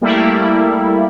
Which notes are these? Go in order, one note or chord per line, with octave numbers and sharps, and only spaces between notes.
G3 A3 A#3 E4